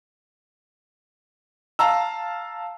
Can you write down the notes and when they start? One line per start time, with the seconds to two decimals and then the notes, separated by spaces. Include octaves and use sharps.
1.79 F5 A5 A#5 E6